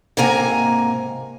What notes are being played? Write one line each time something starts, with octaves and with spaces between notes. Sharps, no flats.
G#2 C3 A#3 G#5 A#5